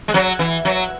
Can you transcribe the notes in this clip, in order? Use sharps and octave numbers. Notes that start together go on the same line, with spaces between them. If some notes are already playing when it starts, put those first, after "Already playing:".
G#3
F#3
E3
F#3